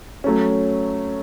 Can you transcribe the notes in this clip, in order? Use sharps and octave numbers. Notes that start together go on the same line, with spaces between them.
F#3 A3 C#4